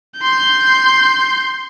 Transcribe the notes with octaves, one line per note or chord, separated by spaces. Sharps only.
C6 G6